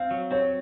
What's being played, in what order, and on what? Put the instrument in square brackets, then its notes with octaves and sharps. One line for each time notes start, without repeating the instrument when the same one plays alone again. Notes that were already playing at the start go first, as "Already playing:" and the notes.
Already playing: [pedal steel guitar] C4 [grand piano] F5
[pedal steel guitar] F#3
[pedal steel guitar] C4 [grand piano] C#5